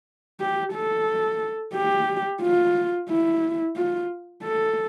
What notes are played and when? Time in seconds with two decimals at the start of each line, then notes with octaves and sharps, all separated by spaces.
0.41 G4
0.74 A4
1.75 G4
2.42 F4
3.10 E4
3.77 F4
4.44 A4